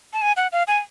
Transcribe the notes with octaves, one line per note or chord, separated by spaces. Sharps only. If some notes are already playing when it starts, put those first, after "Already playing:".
A5
G#5
F#5
F5
G#5